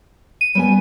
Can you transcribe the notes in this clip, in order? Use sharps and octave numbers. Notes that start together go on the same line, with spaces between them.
D#7
G3 B3 G#5